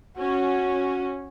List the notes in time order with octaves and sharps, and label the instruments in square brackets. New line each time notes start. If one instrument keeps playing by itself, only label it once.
[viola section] C#4 [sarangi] F#4